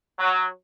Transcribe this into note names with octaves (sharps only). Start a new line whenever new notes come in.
F#3